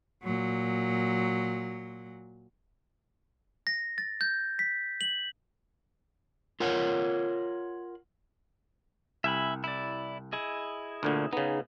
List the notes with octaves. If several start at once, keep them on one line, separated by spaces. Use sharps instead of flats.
A#2 F#3
A#6
A6
G6
B6
F#7
F4 A#4 C#5 F#5
C2 E5 G#5 B5
E4 D5
E4 G#4 D#5
D2 A#2 D3
C#3 B3 D#4 G#4